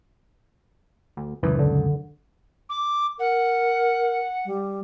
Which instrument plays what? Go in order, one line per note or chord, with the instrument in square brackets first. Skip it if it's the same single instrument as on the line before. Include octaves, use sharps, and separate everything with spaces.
[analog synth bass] D2
[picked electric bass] D#1 C#2 F#2 [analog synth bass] E3
[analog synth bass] D3
[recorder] D6
[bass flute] A#4 [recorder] F#5
[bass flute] G3